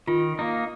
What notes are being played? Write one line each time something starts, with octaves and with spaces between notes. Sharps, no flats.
D#3 F4
A#3 D#4